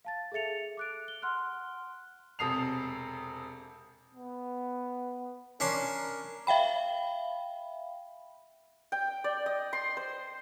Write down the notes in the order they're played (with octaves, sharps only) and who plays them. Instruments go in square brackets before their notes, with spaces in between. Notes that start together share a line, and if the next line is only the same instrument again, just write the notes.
[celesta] F5 A5 A6
G#4 A4 E5 A6 C#7 F7
D6 F#6 D7
G7
F#5 C6 F6 F#6
[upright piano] E1 C3 A4 D#6 C7 F7
[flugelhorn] B3
[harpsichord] C#4 D4 C6 [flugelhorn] A#4
[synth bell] E5 F5 G5 B5
[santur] G5
D5
D#5
C6
C5